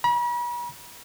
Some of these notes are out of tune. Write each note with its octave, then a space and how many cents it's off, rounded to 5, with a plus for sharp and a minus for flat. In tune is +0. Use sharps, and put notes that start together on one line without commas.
B5 -45